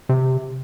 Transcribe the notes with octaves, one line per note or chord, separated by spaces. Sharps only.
C3